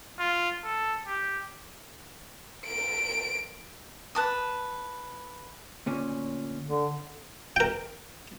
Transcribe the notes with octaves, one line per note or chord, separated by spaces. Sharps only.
F4
A4
G4
D7
B4 A5 D#6
D2 A#2 C#4
D3
A#4 G5